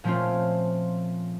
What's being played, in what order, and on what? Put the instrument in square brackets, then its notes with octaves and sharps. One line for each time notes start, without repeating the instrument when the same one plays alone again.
[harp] A#2 F3 A3 C4 C#4 F4